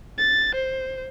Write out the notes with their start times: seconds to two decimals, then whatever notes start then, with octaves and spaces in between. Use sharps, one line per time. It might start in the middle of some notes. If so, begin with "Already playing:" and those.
0.18 A6
0.55 C5